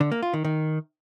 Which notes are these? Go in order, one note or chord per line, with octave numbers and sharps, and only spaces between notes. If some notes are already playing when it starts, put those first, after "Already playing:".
D3
A#3
F4
D#3
D#3